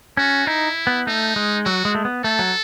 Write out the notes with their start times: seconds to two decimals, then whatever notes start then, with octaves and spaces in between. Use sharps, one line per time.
0.17 C#4 F#4
0.47 D#4 E4
0.87 B3
1.07 A3 D#4
1.36 G#3
1.65 F#3 F#4
1.85 G#3
1.95 A3
2.05 B3
2.24 A3 A4
2.39 F#3